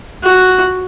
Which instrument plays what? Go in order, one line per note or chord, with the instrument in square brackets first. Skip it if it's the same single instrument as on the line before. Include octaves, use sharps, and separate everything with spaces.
[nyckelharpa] F#4